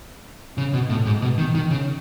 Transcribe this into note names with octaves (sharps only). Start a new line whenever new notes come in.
C#3
B2
A2
G#2
B2
D#3
D#3
C#3